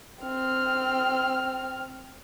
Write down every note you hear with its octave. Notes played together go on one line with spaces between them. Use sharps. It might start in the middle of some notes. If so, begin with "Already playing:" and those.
C4 F6